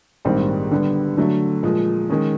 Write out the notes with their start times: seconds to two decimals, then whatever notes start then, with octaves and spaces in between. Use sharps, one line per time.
0.25 A#1 G#2 D#3 G3 C4
0.71 D3 G3 B3
1.17 D3 F#3 A3
1.63 A#2 F3 G#3
2.10 D#3 G#3 C#4